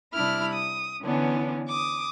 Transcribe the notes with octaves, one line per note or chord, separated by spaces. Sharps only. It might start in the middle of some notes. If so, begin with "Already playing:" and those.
C3 G3 D4 E4 B5 F6
D#6
D3 E3 B3 C#4 D4
D6 D#6